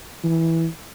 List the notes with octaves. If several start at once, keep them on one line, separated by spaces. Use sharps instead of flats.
E3